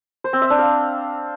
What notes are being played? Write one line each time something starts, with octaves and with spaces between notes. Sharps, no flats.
C5
C4
E5
D4
F5